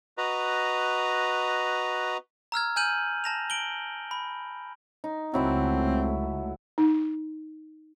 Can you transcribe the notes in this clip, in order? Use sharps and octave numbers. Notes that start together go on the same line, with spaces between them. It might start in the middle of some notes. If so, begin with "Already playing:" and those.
F#4 B4 D#5 A#5
A#5 E6 F6 G#6
G#5 F6 G6 D#7 F#7
A5 A#6 F7
D7 F#7 G7
B5
D#4
C#2 F#3 A3 C4 E4 E5
D#4